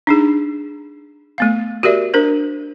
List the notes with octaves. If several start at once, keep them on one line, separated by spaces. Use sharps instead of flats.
D4 D#4 G#4
A3 B3 F5
F#4 G4 A#4 D5 E5
D4 A#4 C5